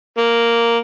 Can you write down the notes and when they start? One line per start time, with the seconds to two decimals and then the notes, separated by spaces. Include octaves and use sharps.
0.18 A#3